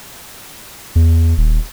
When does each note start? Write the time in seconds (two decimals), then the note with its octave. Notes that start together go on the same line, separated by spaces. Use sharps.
0.95 E2
1.38 D#1